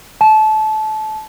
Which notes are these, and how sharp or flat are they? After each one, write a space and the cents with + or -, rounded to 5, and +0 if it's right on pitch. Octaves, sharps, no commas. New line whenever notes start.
A5 -25